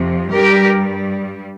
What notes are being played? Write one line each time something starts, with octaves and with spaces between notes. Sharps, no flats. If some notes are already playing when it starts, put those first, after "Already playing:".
Already playing: F2 C3 F3
G2 G3 G4 A#4